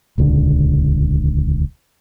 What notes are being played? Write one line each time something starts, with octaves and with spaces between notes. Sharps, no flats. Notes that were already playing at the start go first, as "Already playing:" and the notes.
D#1 C#2 D3